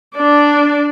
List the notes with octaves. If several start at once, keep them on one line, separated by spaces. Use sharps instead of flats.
D4 D5